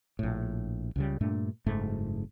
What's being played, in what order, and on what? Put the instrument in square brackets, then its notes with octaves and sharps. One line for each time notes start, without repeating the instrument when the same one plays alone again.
[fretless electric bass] A#1 A2
C#2 C#3 G3
G2 A#2 A3 D4
F#1 G#2 A3